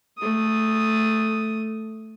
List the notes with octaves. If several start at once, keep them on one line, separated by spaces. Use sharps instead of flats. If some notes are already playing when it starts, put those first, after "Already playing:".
A3 D#6